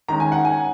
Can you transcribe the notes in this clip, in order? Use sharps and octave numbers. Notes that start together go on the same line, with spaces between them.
D#3 G#3 C#4 A#5
G#5
F#5
G#5